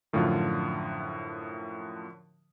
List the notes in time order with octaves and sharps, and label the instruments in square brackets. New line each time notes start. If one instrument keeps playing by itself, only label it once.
[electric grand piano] F#2 A2 D3 F3 F4